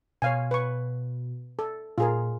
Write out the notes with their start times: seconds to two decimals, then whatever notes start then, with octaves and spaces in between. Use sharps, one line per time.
0.22 B2 C#5 F5 G#5
0.51 B4 C#6
1.59 A4
1.98 A#2 F4 G#4 A#4